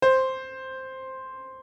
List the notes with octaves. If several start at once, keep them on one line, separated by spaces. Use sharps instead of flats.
C5